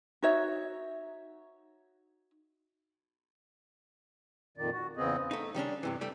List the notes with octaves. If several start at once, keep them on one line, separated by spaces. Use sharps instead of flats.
D#4 F#4 C#5 E5
F2 A#2 D#3 D5
F#4
E2 C#3 B3 C4 G#4 D#5
A3 D#4
D#3 G3 C#4 D4
G2 C3 E3
G3 A3 G4